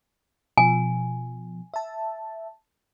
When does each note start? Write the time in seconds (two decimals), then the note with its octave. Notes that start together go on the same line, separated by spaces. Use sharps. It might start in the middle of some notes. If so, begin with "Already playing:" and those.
0.58 B2 F3 G#5
1.74 E5 A5